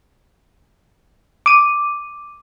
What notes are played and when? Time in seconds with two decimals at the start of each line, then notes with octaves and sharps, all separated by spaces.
1.46 D6 D#7